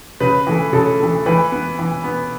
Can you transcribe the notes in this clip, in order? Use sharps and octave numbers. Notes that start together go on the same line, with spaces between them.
C#3 B4
E3 A3
C#3 A4
E3 A3
E3 B4
B3
E3
B3